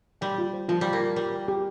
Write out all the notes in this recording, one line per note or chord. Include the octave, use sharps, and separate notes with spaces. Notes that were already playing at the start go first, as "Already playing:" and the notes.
G3 G5
F4
C5
F3 F4
G3 G5
A#3
F4
G3 A#4
G5
G4